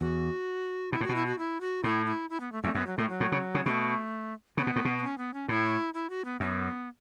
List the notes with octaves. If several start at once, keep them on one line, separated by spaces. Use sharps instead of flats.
E2 F#4
B2 E4
A2 F#4
B2
E4
F#4
E4
F#4
A2 E4
E4
E4
B3
A3
E2 A3
F#2 B3
F#3
A2 A3
F#3
A2
C#3
C#3
B2 A3
C#3 B3
B2
A2
B2
B3
C#4
B3
C#4
A2 E4
E4
F#4
B3
F#2 B3